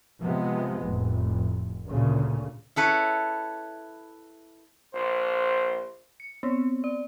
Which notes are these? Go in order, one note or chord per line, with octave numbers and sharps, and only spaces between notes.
C3 F3 G#3 B3
F1 A2
D2 A#2 C#3
E4 A4 B4 C#5
A#1 C5
C#7
B3 C4
D5